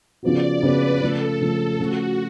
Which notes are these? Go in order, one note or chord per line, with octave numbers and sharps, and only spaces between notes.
C#3 F3 B3 F#4 D5
C#3 F3 B3 F#4 B4
C#3 F3 A3 A4
C#3 F3 A3 A4
C#3 F3 A3 F#4